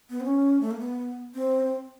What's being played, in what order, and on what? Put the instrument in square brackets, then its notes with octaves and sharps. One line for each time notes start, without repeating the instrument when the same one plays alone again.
[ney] B3
C4
C#4
A3
A#3
B3
C4